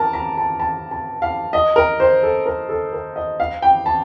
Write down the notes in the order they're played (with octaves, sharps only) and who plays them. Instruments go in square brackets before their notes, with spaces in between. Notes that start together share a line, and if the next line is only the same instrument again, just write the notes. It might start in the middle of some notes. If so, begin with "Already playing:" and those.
Already playing: [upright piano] A#4 A5
A#5
A5
A5
A5
F5
D#5
A#4
C5
A4
A#4
A4
A#4
D#5
F5
G5
A5